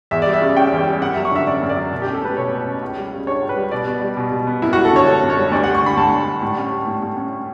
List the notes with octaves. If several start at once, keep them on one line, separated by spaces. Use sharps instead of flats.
E2 E5
G3 D5
E5
C#3
C#4 G5
E2
G3
F#2 F#5
E5
F#3
C#6
D3 E5
C#4 D5
F#2
D5
F#3
B2
C#4 G4
A4
A3 B4
B2 C#5
B2
C#4
C#2
G3
C#3
D4 C#5
C#2
B4
G3
B2 D5
B3
G3
B2
B2
B3
F#2 E4
F#4
G3
A4
D3 C#5
D4 A4
F#2
C#5
G3
D2 D5
F#5
G3
C#6
D3 B5
D2 A5
D2
G3
A2
C#4
G3
A2
A2
C#4